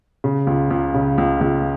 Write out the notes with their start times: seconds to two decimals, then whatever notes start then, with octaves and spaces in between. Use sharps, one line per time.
0.24 C#3
0.47 C#2
0.70 C#2
0.94 C#3
1.18 C#2
1.41 C#2